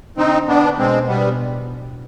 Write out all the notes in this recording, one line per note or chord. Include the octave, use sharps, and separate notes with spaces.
D3 C4 D#4
D3 B3 D4
B2 G#3 C4
B2 G3 B3